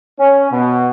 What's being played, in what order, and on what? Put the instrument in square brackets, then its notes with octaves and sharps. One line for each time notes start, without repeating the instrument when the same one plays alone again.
[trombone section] C#4
B2